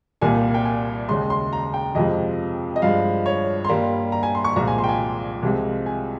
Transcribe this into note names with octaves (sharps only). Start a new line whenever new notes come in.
C2 A#2 G3 A#3 G#5
G5
G#5
D#2 C#3 G#3 C6
C6
A#5
G5
F2 C3 F3 G#3 D#5
D#5
G2 F3 G#3 F5
C#5
C6
G2 G3 A#3 A#5
A#5
G#5
C6
C#6
C2 A#2 F3 G#3 A#5
G#5
C6
G5
G#5
C2 C3 F3 G#3
G#5